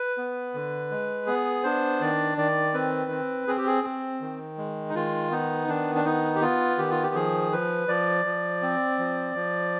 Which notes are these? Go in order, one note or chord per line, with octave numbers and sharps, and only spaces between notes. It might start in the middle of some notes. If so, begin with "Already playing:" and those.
Already playing: B4
B3
D3
G#3
B3 G#4
D4 C5
D#3 D5
D#3 D5
C4 B4
C4
C4 G#4
G4
G#4
C4
D#3
G#3
D#4
D#3 F4
B3 D#4
D#3 D4
D4
B3 D#4
G4
B3 F4
D#3 G4
F4
G4
F3 G#4
F3 B4
F3 D5
F3
C4
F3
F3